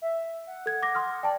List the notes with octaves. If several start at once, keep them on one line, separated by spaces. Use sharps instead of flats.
E5
F#5
A4 G#6
D6 A#6
C6 D#6 F6
D5 G5 A5